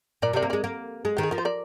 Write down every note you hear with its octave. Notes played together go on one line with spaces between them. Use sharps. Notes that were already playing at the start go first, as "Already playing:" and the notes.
A#2 A#4 D5
C3 A#4 D5
A#3
G#3 A#4 D5
A#3
G#3
D#3 G4
G#4
F3 A#4
C5
A#4 D5